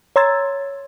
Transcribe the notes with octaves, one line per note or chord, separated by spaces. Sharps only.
C#5 A#5 C6 E6 G#6 A6